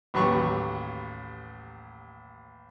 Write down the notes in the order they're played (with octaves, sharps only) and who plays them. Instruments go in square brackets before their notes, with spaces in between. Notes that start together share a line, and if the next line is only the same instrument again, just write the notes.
[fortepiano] A1 D#2 F#3 G4 B4 C#6